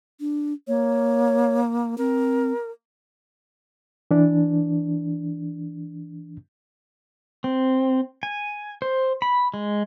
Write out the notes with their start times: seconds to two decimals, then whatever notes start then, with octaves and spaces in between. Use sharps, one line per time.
0.20 D4
0.68 A#3 C#5
1.98 C4 A#4
4.11 E3 D4
7.44 C4
8.23 G#5
8.82 C5
9.22 B5
9.54 G#3